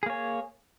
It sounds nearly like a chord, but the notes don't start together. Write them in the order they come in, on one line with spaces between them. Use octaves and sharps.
G#4 A#3 C#5